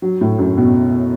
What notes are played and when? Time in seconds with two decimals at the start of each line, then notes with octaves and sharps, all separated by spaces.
0.02 F#3
0.21 A2
0.39 F#2
0.57 B2